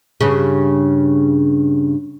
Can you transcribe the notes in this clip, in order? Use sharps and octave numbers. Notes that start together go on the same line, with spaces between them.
G2 C#3